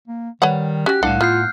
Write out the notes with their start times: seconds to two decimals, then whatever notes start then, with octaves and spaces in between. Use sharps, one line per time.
0.08 A#3
0.42 D#3 G3 B4 C#5 F#5
0.86 C#4 F#4 G4 F#6
1.03 C2 A2 D4 F5 F#5
1.21 B3 F4 F6 G6 C7